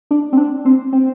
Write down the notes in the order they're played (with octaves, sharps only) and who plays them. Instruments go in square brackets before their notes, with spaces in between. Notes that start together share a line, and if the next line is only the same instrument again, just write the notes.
[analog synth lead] D4
C4
D4
C4
C4